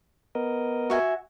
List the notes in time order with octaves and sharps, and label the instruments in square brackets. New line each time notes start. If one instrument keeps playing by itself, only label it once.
[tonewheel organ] B3 A#4 D#5
[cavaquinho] F#4 E5 G#5